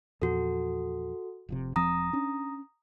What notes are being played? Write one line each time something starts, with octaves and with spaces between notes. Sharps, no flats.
E2 A#2 F3 F#4 A4
F1 F2 C3
E1 F3 C4 A#5 D#6 A#6
C#4 D4